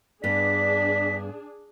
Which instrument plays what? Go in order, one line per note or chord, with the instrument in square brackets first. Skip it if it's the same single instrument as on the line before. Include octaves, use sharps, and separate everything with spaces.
[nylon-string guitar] G2 B3 [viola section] D4 G#4 [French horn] D5 [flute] B6